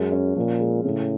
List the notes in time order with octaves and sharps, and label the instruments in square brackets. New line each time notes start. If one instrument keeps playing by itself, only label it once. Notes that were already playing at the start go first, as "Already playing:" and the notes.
Already playing: [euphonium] F#2 [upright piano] G#3
[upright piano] C#4
[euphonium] A#2 [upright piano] F3
[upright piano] G#3
[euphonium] A2 [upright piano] C#3